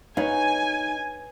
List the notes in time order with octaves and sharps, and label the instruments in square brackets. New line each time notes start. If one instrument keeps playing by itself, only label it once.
[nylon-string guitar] D#4 [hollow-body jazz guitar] B4 C#5 F5 [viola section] G#5